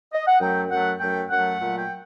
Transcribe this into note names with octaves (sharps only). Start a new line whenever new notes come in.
D#5
F#5
F#2 F#3 A3 G5
F#2 F#3 A3 F#5
F#2 F#3 A3 G5
F#2 F#3 A3 F#5
A#2 F#3 A3
G5